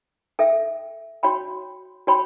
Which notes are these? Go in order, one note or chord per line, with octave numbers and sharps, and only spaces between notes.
A4 E5 G5
F#4 C#5 G5 B5
F#4 C#5 G5 B5